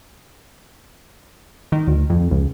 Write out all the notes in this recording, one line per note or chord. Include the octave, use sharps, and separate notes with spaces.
D#3
D2
F2
C#2